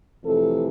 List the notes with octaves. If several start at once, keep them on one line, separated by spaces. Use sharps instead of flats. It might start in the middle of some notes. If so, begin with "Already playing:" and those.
F2 C3 E3 A3 A4